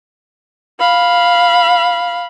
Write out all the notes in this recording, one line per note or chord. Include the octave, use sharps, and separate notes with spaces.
F5 B5